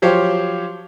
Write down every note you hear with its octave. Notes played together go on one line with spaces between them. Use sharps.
F3 F#3 G4 C5 C#5 F5